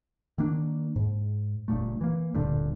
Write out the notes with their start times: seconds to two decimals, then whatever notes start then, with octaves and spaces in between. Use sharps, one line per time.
0.38 D#3 A#3 D4
0.96 G#2
1.68 F#1 G2 A#2 A3
2.01 E3 A#3
2.34 D1 G2 A#2 D3